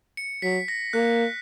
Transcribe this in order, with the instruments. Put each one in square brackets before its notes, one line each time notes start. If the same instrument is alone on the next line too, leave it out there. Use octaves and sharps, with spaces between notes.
[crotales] C#7
[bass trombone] F#3 [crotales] B6
[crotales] A#6
[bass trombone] A#3 [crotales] F#6